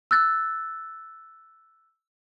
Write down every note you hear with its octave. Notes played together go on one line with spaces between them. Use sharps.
E6 F#6 A6